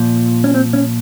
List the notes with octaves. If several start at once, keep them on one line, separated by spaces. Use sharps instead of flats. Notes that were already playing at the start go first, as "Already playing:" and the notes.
Already playing: A#2 F3
C#4
C4
C#4